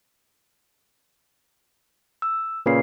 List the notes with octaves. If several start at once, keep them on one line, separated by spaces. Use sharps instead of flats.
E6
A#2 C#3 B4 C7